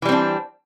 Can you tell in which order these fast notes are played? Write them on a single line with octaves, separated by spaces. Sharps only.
E3 G3 C4 D4